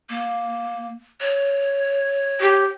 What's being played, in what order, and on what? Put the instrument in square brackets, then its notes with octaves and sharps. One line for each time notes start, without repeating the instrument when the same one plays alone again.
[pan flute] A#3
C#5
[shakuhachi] G4